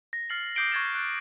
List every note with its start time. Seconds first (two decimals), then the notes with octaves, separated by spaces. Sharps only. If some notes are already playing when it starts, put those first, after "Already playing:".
0.13 A#6
0.30 F6 A6 C7 C#7 F#7
0.56 D6 D#6 G6 C7 D7 G7
0.72 C#6 F#6 G#6 A6 C7 E7
0.95 F#6 G6 A6